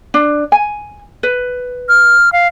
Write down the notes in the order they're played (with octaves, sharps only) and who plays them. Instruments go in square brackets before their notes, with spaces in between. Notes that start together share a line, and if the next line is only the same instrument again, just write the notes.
[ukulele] D4
G#5
B4
[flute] F6
F5